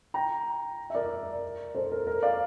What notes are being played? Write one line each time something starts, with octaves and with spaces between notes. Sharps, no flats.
G5 A#5
E5
A#4 D5
A4 C5
A#4
A#4
D5 F5